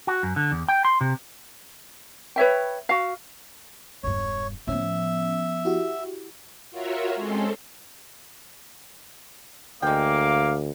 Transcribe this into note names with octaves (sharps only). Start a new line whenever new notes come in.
F#4
F#2
D3
E2
G5
C6
C3
B4 C#5 E5 G5
F#4 F5
E1 G2 C#5
A2 F3 B3 C#4 E5
E4 F#4 G4
F4 F#4 A#4 C#5 E5
G#3 C4 C#4 A4 C5
D2 G#3 A#3 F5 G5 D6